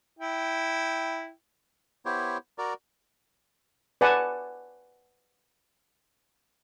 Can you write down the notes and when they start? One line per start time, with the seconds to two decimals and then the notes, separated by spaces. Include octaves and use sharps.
0.19 E4 G5
2.06 B3 E4 G4 C5 C#5
2.58 F#4 A#4 D5
4.01 B4 D5 F#5 G#5 A5